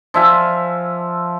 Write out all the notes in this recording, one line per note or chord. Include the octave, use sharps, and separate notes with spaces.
F3 E5 G#5